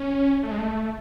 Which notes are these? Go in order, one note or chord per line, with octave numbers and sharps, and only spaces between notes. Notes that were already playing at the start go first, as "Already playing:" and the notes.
Already playing: C#4
A3
G#3
A3